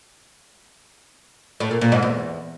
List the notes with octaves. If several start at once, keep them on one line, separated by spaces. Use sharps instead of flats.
A2
A#2
A#2
G#2
E2